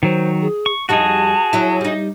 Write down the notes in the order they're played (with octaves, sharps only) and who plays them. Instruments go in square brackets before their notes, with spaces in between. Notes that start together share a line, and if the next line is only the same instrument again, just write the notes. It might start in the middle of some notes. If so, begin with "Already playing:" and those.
[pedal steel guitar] D#3 F#3 [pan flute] C5
[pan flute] G#4
[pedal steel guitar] C#6
[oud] F2 G3 D#4 [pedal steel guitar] F#4 G#4 [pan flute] A5
[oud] F#3 E4
G3 D#4